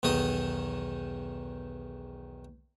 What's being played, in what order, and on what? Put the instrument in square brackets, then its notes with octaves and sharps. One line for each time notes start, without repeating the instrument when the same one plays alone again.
[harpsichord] B1 E2 D#3 D#4 D#6